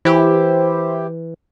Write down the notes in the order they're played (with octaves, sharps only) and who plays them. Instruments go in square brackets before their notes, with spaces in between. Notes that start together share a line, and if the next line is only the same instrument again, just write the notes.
[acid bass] E3 [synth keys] E4 G4 [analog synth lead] C5